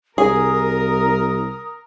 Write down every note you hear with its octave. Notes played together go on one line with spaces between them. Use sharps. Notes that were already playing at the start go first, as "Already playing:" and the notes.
C2 G#4 A#4 D#6